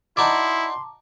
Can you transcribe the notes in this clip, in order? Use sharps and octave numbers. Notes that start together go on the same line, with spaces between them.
D#4 E4 F#4 D5 A5 A#5 C6 D6